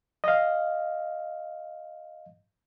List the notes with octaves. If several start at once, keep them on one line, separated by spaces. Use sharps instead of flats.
D#5 F5